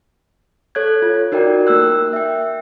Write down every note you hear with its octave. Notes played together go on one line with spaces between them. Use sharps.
A4 C#5 F#6 G#6
F4
D#4 F#4 A#4 D5 G5
A#3 A#4 E6 F#6
E5 G5